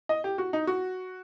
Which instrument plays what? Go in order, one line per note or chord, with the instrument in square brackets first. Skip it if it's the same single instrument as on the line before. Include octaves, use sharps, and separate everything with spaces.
[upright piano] D#5
G4
F#4
D#4
F#4